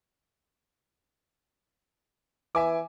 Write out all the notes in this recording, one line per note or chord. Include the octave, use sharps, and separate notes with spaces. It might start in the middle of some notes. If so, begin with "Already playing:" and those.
E3 E5 G#5 D6